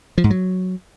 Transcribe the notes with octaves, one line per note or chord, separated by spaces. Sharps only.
F3
G#2
F#3